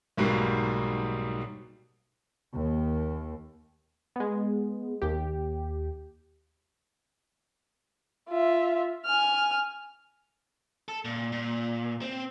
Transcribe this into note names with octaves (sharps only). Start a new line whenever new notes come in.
B1 G#2 B2 G3 A#3
D#2
G#3 B3
D#2 G4
F4 E5
G#5 F6
A4
A#2
A#2
C4